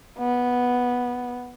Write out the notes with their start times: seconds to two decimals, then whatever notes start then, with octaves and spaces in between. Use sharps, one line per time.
0.19 B3